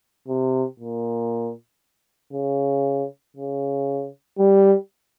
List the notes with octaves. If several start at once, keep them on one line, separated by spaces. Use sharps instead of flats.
C3
A#2
C#3
C#3
G3